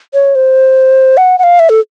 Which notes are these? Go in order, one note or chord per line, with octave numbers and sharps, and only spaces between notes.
C#5
C5
F#5
F#5
F5
E5
A4